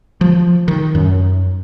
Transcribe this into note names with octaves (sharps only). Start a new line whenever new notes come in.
F3
D#3
F#2